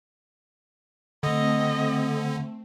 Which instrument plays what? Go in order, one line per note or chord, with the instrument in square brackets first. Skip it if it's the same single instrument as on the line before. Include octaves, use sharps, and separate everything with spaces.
[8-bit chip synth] D3 [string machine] A3 C4 [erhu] D#5